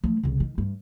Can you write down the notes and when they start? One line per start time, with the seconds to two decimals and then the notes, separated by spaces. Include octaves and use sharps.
0.04 F3 A3
0.23 C2 C#3
0.40 D#3
0.58 G2